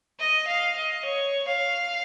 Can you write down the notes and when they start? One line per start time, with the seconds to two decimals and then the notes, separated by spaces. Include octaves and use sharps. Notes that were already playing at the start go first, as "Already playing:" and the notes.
0.19 D#5
0.48 F5
0.76 D#5
1.05 C#5
1.48 F5